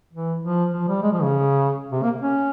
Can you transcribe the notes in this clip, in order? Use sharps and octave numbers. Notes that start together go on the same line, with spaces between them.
E3
F3
F3
G3
G#3
F3
C#3
C3
A#3
C#4